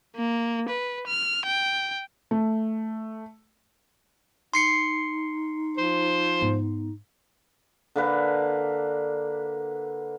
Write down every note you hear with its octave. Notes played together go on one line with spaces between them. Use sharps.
A#3
B4
F6
G5
A3
D#4 C6 C7 C#7
F3 C5
G#2 B3
D3 A#3 B4